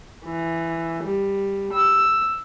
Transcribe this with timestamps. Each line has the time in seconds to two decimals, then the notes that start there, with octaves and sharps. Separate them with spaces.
0.25 E3
1.02 G3
1.73 E6